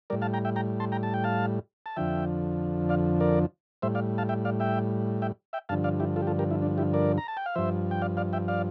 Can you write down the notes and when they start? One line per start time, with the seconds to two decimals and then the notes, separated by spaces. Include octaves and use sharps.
0.10 A2 G3 A#4 D5
0.22 F5 A5
0.33 G5 A#5
0.45 E5 G5
0.56 G5 A#5
0.80 A5 C6
0.92 G5 A#5
1.03 A5
1.14 G5
1.24 F5 A5
1.86 A5
1.96 F2 D3 F3 E5 G5
2.89 D5 F5
3.21 A#4 D5
3.82 A2 G3 C5 E5
3.95 D5 F5
4.18 F5 A5
4.29 E5 G5
4.45 D5 F5
4.60 E5 G5
5.22 E5 G5
5.53 E5 G5
5.69 G2 D3 F3 F5 A5
5.84 D5 F5
6.00 E4 G4
6.16 F4 A4
6.22 G4
6.27 F4 A4
6.39 G4 A#4
6.51 E4
6.62 D4
6.78 E4 G4
6.93 A#4 D5
7.18 A#5
7.28 A5
7.37 G5
7.46 F5
7.55 G2 F3 C5 E5
7.91 G5
8.02 D5 F5
8.17 D5 F5
8.33 E5 G5
8.48 D5 F5